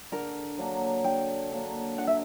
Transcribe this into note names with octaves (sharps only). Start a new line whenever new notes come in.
D3 A#4
F#3 A#3 D4
D3 G5
F#3 A#3 D4
D3 F#5
E5